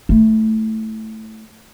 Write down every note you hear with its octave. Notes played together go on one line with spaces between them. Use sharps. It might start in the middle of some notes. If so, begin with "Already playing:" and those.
A3 E4